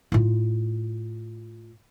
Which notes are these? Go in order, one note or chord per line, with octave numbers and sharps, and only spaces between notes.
A2 F4